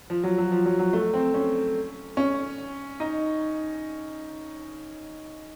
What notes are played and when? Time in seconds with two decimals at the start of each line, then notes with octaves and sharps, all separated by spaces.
0.10 F3
0.24 F#3
0.38 F#3
0.52 F3
0.66 F#3
0.79 F#3
0.93 A3
1.14 C4
1.34 C#4
2.17 C#4
3.00 D#4